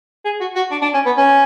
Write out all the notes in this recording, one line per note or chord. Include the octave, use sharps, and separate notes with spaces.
G#4
F#4
F#4
D4
D4
C#4
B3
C#4